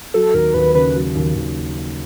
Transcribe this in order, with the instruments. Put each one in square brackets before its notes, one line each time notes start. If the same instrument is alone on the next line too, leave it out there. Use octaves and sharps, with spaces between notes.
[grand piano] F#3 [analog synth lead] A4
[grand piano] D#2 [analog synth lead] A#4
[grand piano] D#2 [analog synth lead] B4
[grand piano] C#3 [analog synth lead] B4
[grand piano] F#3
D#2
D#2